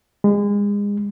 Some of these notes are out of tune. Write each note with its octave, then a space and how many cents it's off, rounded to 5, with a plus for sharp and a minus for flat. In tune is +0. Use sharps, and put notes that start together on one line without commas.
G#3 -30